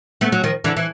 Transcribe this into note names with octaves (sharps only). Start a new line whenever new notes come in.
A3 B3
F#3
D#3 F3
D3 E3
E3